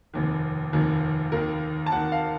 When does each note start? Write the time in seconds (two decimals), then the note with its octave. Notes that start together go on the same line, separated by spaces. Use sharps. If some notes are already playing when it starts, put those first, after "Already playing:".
0.14 F1 D#2 D#3
0.73 F1 D#2 D#3
1.32 D#2 D#3 A#4
1.86 A5
1.91 D#2 D#3 F#5
2.12 F5